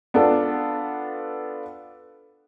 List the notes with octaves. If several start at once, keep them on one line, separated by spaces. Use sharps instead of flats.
B3 D4 F4 A4